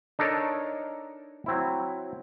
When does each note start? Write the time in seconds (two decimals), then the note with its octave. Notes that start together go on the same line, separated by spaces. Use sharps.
0.19 D4 D#4 A4 A#4 C#5
1.46 F#3 C4 E4